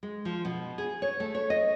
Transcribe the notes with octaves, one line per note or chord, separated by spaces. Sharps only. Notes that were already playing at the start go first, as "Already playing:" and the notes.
G#3
F3
B2
G#4
C#5
A3
C#5
D#5